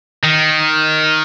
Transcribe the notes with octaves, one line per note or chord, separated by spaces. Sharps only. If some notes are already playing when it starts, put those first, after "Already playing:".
D#3